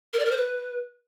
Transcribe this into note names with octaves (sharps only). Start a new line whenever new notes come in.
A#4
D5
A#4
C5
B4